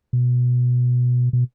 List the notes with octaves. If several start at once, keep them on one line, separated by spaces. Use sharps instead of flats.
B2
B2